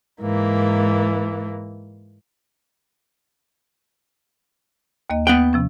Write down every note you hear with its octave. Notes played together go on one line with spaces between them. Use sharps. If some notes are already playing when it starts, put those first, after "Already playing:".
G#2 E3 A#3
D#2 A#3 D#5
B3 F#5 G5
C3 F3 C#4